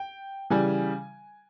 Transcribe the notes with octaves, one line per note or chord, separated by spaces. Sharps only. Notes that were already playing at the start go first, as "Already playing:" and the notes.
Already playing: G5
C#3 E3 G3 G#5